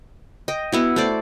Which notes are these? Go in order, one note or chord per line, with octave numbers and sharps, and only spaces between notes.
D#5 G5
B3 E4 F#4
A3 C5 D5